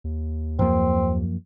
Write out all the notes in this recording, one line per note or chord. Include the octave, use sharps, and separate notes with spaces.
D#2
F#2 F3 A#3 C4